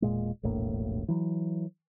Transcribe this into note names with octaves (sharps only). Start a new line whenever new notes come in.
E1 A#2 G#3
E1 A#1 A2 A#3
E3 F#3